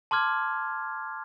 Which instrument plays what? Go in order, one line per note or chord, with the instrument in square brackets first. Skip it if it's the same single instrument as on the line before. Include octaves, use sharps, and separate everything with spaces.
[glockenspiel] A5 C6 D6 F6 G#6